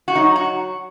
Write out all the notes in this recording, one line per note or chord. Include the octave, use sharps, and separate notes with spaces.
F#4
F#3 D#4
F#4